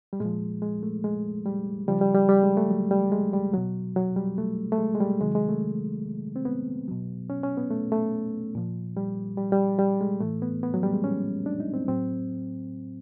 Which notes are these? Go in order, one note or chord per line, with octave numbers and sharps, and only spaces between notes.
G3
A#2 F3 G#3
G#3
A3
G#3
G3
C#3 F3 G3
G3
G3
G3
G#3
A3
F#3
G3
G#3
G3
B2 F#3
F#3
G3
A3
A3
G#3
G#3
G3
C3 D#3 F#3 G#3
G#3
A3
C4
B3
B2 F#3
C#4
C#4
B3
A3
A3
A#2 F3
G3
G3
G3
G3
G#3
A2 E3 A3
B3
B3
F#3
G3
G#3
C#4
D4
D#4
C4
A2 F#3 C4